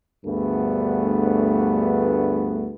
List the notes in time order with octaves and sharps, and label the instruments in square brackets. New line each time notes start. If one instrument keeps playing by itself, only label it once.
[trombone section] D2 G2 A3 B3 G#4 B4